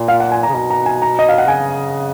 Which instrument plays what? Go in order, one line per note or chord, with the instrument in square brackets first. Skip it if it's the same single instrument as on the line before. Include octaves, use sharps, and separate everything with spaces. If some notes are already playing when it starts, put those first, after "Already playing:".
Already playing: [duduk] A#2
[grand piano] F5
F#5
G#5
A#5
[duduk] C#3
[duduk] B2 [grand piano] A#5
[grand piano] A#5
G#5
A#5
D#5
F5
F#5
[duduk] C#3 [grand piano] G#5